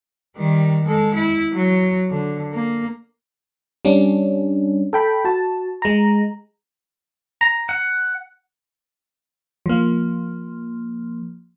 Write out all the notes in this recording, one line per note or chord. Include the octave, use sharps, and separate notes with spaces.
D#3 G3
G#3 A4
E4
F#3
D3
A#3
G3 C#4 D4
A4 G5 B5
F#4 A5
G#3 A#5
A#5
F#5
F3 A#3